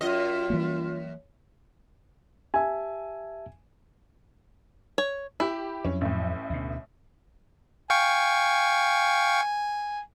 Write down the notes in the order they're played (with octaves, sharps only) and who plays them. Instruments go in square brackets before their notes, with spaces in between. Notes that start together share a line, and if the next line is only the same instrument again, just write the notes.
[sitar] F#2 D#5 [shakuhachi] F4
[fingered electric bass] E3 G3 A#3
[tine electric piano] G4 E5 A5 [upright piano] G#5
[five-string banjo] C#5
[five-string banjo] E4 [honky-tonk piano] G4 B5
[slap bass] F2 F#3 [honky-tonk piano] C#4
[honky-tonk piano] A1 A2
[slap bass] D2 B2
[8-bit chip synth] F5 G5 C#6 [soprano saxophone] G#5